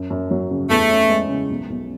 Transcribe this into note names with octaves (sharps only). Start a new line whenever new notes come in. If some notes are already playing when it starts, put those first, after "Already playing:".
Already playing: F#2
F#2
F#3
C#3
E2 A3
C#4
G#3
C#3
B1
B1